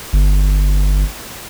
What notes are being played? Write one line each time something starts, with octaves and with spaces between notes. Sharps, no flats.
G1